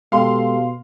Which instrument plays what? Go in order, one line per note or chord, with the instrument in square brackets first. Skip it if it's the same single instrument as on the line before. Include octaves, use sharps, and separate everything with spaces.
[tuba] B2 [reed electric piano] G#3 G4 A4 [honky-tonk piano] F5 C6